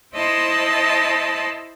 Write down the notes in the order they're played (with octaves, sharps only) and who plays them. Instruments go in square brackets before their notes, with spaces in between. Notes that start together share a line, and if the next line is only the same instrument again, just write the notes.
[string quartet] E4 C5 D#5 A5 B5 C6